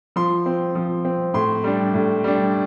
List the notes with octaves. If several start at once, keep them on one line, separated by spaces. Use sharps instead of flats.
F3 C6
C4
F3
C4
A2 C6
G3 D4
A2
G3 D4